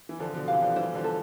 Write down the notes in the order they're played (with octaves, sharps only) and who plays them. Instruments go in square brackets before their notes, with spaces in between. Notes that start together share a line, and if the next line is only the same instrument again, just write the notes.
[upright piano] E3
[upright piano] D3 F3 [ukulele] A4
[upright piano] B2 D3
[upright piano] C3 E3 [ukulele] F5
[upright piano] D3 F3
[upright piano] E3 G3 [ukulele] C5
[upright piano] D3 F3
[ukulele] A4